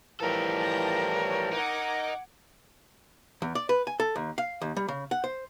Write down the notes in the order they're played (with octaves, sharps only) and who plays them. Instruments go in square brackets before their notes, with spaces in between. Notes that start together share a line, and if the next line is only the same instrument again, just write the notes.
[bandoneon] A2 E3 F3 [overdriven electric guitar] G3 A4 [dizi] A#4
[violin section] A5 G6 A#6
C#5
[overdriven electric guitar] D#4 [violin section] F#5 D6 G#6
[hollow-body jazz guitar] E2
D5
B4
G#5
A4
D#2
F5
D#2
G3
C#3
F#5
C5